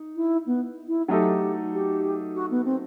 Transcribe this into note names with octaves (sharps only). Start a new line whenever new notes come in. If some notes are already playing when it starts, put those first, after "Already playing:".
Already playing: D#4
E4
B3
E4
F#3 A3 D#4 G4 A4
G4
F#4
B3
C4